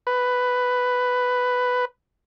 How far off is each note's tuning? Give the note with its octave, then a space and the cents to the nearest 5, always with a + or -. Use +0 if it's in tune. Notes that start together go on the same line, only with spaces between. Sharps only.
B4 +5